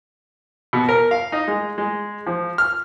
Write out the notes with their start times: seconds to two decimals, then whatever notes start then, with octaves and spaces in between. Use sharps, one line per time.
0.73 B2
0.89 A#4
1.11 F5
1.32 D#4
1.48 G#3
1.78 G#3
2.27 F3
2.58 F6